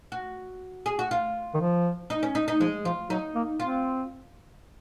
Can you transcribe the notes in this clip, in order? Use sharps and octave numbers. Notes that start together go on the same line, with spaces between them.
F#4
G#4
F#4
F4
D#3
F3
D#4
C#4
D#4
D#4
F3 G#3
F3 F4
F#3 D#4
A#3
C4 F4